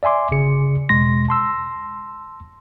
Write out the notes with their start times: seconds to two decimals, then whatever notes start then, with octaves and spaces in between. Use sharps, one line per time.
0.03 D5 E5 G#5 C6 D6
0.31 G1 C#3 G#4 C#7
0.89 E2 B2 G#3 C6 A#6
1.29 A5 C6 E6